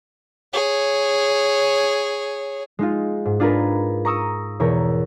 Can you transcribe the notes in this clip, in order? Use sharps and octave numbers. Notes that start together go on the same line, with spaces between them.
G#4 C#5
G#3 D#4 F4
G#2
D4 F4 G#4 A#4 B4
A#5 C#6 D#6 E6 D#7
E2 B2 A#4 C#5